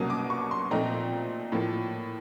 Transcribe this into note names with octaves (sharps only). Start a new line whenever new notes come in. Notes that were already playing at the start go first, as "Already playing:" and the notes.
Already playing: C2 B2 F#3 A#3 C#4 D#6
D6
C#6
C6
A#2 F3 A3 C4 D#4 A#5
A2 F3 A#3